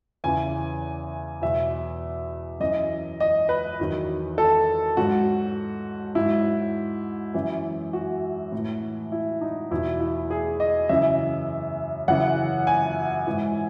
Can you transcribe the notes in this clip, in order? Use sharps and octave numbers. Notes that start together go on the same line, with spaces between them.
E2 C#3 E3 G#5
E2 B2 F#3 E5
F#2 E3 D#5
D#5
B4
E2 D#3 F#3
A4
G#2 F#3 F#4
G#2 F#3 E4
F#2 E3
F#4
A2
E3
E4
D#4
E2 B2 F#3 E4
E4
G#4
D#5
F#2 C#3 E3 E5
F#2 C#3 E3 F#5
G#5
G#2 E3